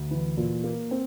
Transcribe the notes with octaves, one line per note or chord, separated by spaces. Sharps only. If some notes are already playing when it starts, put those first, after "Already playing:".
Already playing: D2
E3
A#2
A#3
C4